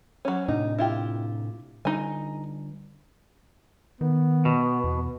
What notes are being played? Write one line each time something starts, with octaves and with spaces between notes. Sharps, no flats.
F#3 C#4
A2 C3 D4 D#4
E4 F4 G4
D3 G3 D#4 G#5
D#3 B3
B2
E2